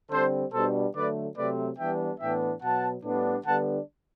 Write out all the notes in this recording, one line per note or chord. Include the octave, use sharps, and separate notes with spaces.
D3 G3 C4 A4 C5
B2 G3 B3 D4 A4 C5
D3 F#3 A3 B4 D5
C3 F#3 A3 C4 B4 D5
E3 G3 B3 D4 E5 G5
A2 E3 B3 D4 E5 G5
B2 F#3 B3 F#5 A5
A2 G3 B3 D4
D3 G3 B3 D4 F#5 A5